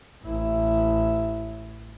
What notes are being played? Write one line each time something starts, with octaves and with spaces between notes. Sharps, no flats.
A1 E4